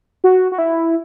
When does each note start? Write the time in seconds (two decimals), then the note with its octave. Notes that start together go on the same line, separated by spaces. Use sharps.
0.24 F#4
0.52 F#4
0.58 E4